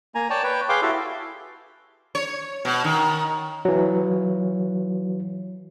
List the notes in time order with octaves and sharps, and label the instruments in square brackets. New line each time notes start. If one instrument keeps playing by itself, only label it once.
[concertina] A#3 G#5 A#5
C#5 D5 G5 A5
B4 C#5 G5
G#4 B4 F5 G5 C6 D6
E4 F#4 G4 A4
[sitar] C#5
B2
D#3
[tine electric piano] E3 F#3